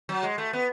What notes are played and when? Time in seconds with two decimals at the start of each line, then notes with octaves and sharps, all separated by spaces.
0.09 F#3
0.23 G#3
0.38 A3
0.53 B3